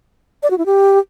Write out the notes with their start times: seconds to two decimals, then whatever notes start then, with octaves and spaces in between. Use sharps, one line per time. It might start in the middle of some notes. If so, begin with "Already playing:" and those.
0.43 D5
0.50 F#4
0.58 E4
0.66 G4